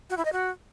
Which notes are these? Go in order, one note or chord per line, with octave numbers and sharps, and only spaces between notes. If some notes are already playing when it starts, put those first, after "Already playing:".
F#4
E4
D#5
F#4